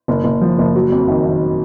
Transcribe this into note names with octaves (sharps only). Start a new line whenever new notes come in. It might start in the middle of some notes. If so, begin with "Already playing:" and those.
F#1
F#1
F3
F#1
F#3
F2
D#3
D#3